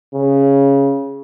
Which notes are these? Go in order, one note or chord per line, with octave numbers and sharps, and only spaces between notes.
C#3